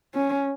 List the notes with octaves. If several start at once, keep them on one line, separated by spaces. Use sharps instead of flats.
C#4